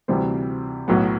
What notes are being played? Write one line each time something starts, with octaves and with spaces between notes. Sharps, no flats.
D2 C3 E3 G3 C4
B1 A2 F#3 B3